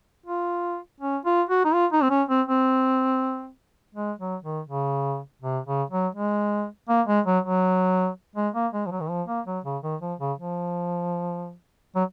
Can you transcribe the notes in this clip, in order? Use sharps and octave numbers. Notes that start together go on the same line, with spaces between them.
F4
C#4
F4
F#4
D#4
F4
D#4
C4
C#4
C4
C4
G#3
F#3
D#3
C#3
C3
C#3
F#3
G#3
A#3
G#3
F#3
F#3
G#3
A#3
G#3
F3
F#3
D#3
F3
A#3
F#3
C#3
D#3
F3
C#3
F3
F#3